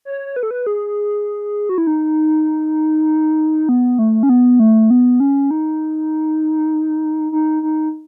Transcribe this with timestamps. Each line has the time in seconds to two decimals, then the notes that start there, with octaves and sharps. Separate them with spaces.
0.05 C#5
0.36 B4
0.43 A4
0.51 B4
0.67 G#4
1.69 F#4
1.78 E4
1.87 D#4
3.69 B3
3.99 A3
4.23 C#4
4.29 B3
4.60 A3
4.90 B3
5.20 C#4
5.51 D#4
7.32 D#4
7.63 D#4